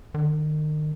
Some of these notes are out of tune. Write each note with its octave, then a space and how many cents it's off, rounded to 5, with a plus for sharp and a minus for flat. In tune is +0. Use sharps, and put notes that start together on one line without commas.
D#3 -35